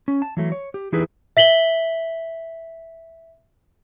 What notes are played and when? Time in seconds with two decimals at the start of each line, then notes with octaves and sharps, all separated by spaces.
0.08 C#4
0.22 A5
0.37 E3 F#3 A3
0.52 C#5
0.74 G4
0.92 E3 D#4 E4 G4 G#4 B4
1.37 E5 B6 F#7 G7